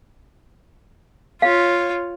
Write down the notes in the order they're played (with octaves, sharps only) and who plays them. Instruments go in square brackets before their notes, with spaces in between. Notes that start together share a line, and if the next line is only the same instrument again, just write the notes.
[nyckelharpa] F4 [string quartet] C#5 [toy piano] F5